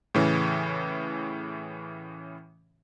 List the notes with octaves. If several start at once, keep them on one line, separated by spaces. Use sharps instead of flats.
A2 C#3 E3 C#4